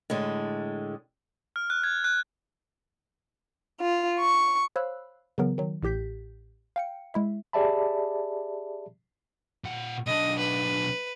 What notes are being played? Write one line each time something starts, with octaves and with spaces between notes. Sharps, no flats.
A2 D3 G#3
F6
F#6
G#6
F#6
F4
C#6
C5 C#5 F5 B5 E6 F#6
C#3 E3 F#3 B3 A#4
D#3 F#3
A1 A2 G4 G6 B6
F5 G5 C#7
G#3 E4 E5
G4 G#4 D5 E5 A5 B5
A#2 F#5
B1 D4 D#5
B4